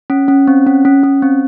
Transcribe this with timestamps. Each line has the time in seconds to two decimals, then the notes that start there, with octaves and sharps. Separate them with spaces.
0.10 C#4
0.28 C#4
0.48 C4
0.67 C#4
0.85 C#4
1.04 C#4
1.22 C4